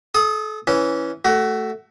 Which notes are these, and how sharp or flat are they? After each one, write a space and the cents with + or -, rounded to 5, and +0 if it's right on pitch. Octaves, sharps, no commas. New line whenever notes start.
A4 -35 D#6 +0
E3 +0 C#4 +0
A3 +0 F#4 +25